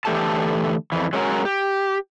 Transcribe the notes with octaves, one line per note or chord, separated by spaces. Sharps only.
D3 E3 A3 G4 A4 A5
F2 E3
F#3 G#3 C#4 F#4 A#4
G4